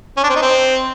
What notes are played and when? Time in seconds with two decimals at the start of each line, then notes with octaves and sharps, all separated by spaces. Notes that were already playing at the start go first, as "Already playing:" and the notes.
0.17 C#4
0.23 D4
0.30 C4
0.36 D#4
0.42 C4